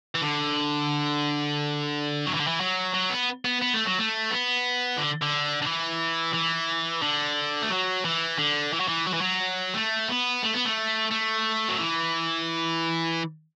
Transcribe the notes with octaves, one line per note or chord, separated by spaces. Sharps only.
E3
D3
F#3
E3
D3
E3
F#3
F#3
B3
B3
B3
A3
F#3
A3
B3
D3
D3
D3
E3
E3
D3
A3
F#3
E3
D3
E3
F#3
E3
F#3
E3
F#3
A3
B3
A3
B3
A3
A3
F#3
E3